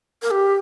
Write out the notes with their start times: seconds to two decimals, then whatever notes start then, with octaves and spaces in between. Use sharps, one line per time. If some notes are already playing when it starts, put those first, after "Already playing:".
0.22 A#4
0.31 G4